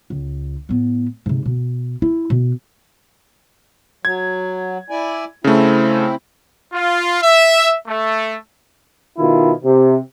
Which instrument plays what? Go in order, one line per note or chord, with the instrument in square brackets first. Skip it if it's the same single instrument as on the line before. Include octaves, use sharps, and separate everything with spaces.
[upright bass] C#2
A2 B3
G#2 C3
B2
E4
B2
[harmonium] F#3 [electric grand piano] G#6
[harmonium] E4 D5 G#5
[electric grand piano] C#3 A3 [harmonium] C4 E4
[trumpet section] F4
E5
A3
[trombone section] B2 D#3 E4 F4
C3